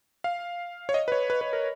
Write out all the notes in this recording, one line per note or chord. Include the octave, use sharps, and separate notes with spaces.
F5
C#5
D#5
B4
C#5
B4
B4
A#4